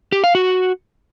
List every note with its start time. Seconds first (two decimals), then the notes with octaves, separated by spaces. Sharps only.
0.12 G4
0.24 F5
0.35 F#4